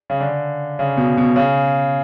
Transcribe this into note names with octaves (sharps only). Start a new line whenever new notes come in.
C#3
D3
C#3
B2
B2
C#3